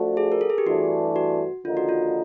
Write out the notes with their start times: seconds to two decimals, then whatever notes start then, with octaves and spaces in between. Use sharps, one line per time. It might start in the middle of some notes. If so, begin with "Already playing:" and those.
Already playing: F3 A3 D4 F#4
0.17 G#4
0.32 A#4
0.41 A4
0.50 G#4
0.58 G4
0.67 G2 E3 A3 D4 F#4
1.16 F#4
1.65 D#2 D3 F3 A#3 D#4 F4
1.77 F#4
1.89 F4